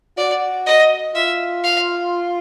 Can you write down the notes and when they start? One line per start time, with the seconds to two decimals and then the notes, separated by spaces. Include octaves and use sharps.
0.17 F#4 D5
0.66 D#5
1.15 F4 E5
1.64 F5